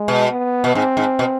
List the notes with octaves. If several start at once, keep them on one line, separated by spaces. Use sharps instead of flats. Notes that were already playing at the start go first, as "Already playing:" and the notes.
Already playing: G#3
B2
B3
B2
G#2 C4
G#2
B2